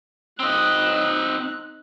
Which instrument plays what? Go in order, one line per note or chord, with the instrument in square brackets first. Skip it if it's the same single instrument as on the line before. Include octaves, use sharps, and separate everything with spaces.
[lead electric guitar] C4 D#5 [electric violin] D#4 F#6